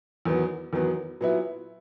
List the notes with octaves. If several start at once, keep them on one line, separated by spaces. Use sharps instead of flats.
E2 D#3 F#3 B3
E2 D#3 F#3 B3
A#2 F#3 B3 E4